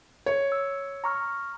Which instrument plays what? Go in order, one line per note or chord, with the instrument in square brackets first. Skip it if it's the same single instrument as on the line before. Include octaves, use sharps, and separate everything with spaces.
[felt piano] C#5
[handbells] E6
A#5 C#6 F6